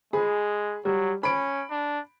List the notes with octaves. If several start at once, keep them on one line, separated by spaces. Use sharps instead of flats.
G#3 G#4 B5
F#3 G3
C#4 B5 D7
D4